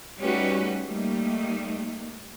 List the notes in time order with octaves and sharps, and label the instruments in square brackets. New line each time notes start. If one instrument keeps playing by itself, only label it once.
[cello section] G3 A3 C#4 D#4 F#4 B4
G3 A3 A#3 D#4